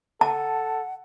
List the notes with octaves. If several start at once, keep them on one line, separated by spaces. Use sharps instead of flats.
A4 F#5 A5